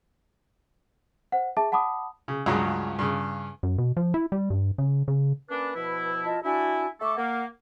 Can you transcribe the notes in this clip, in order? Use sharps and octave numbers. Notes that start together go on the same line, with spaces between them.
C5 F#5
G#4 E5 A5 D6
F#5 A5 B5 D6 D#6
C#3
C#2 G2 C#3 F#3 A#5
G2 C#3
F#2
B2
F3
E4
G3
G2
C#3
C#3
A#3 C#4 D4 B4
B2 F3 E4
F4 D#5 A5
D4 E4 F#4 G#5
A3 A4 C#6 D6
A#3 F#5